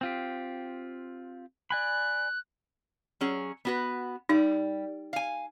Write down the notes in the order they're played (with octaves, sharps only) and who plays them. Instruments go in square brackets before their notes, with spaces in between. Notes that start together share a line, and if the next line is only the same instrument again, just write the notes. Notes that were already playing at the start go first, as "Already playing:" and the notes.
[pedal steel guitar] C4 F4 G4
[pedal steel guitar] D5 G#5 B5 [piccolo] F#6
[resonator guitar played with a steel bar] F#3 C#4 G#4
B3 F#4 B4
[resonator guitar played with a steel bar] G3 [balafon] D#4
[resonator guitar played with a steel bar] F5 G#5